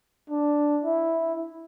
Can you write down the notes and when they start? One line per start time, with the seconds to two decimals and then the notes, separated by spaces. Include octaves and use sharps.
0.30 D4
0.84 E4